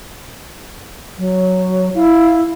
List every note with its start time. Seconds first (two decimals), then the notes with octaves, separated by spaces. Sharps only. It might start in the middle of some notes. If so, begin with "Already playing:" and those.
1.19 F#3
1.95 E4 F5